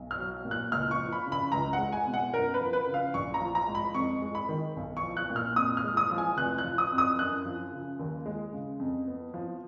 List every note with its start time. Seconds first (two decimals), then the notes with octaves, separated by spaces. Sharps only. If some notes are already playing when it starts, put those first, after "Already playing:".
Already playing: B1
0.11 F6
0.18 F#3
0.45 A#2
0.51 F#6
0.71 C#2 F6
0.91 C#6
0.98 F3
1.12 B5
1.26 C#3
1.32 B5
1.52 C#2 A#5
1.73 F#5
1.79 G#3
1.92 G#5
2.07 B2
2.14 F#5
2.33 F#2 A#4
2.54 B4
2.61 F3
2.73 B4
2.87 C#3
2.94 F5
3.14 A#1 C#6
3.34 A#5
3.40 F3
3.55 A#5
3.67 G#2
3.75 B5
3.94 F2 C#6
4.22 G#3
4.35 B5
4.49 D#3
4.76 B1
4.97 C#6
5.03 F3
5.17 F#6
5.30 A#2
5.36 F6
5.56 F2 D#6
5.77 F6
5.84 G#3
5.97 D#6
6.11 F3
6.18 G#5
6.37 F1 F#6
6.58 F#6
6.64 F3
6.78 D#6
6.91 F2
6.98 D#6
7.19 F#2 F#6
7.45 F3
7.72 C#3
7.99 D#2
8.26 G#3
8.53 C#3
8.80 F2
9.07 B3
9.34 F3